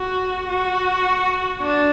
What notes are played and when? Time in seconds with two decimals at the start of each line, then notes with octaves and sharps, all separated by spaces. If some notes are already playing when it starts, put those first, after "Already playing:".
Already playing: F#4
0.49 F#4
1.62 D4